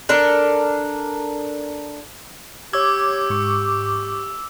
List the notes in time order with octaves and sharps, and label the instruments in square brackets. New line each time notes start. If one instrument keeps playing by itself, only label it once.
[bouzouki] D4 A4 A#4
[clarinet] G4 [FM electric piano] C#5 G#6 [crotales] D6 E6
[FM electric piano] G#2 C#6